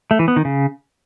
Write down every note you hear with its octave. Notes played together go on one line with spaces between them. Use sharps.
A3
E3
B3
D#3
C#3